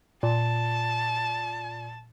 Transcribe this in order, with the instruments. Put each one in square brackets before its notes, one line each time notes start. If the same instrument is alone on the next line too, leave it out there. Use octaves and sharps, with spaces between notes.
[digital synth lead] A#2 [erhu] A5